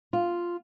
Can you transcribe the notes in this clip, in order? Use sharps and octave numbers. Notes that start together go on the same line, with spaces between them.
F4